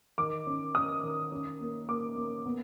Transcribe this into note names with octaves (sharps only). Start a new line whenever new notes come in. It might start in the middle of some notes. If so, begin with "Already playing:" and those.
D#3 D6
C#4
C#4 D#6
D#3
C#4
A#3
A#3 D6
A#3
B3